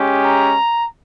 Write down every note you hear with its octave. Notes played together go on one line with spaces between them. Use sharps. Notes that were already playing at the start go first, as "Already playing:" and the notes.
Already playing: G#3 C#4 G4
A#5